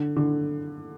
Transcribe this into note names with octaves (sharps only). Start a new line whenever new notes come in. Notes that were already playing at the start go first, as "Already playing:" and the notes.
Already playing: D3
D3